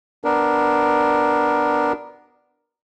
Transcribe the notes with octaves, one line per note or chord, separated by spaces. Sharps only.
B3 D4 A#4